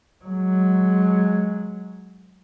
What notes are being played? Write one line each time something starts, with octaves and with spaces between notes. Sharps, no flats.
F#3 G#3